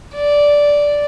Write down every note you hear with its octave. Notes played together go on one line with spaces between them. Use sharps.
D5